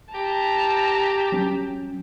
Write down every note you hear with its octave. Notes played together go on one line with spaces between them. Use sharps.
G4 A5 A#5
F#3 C#4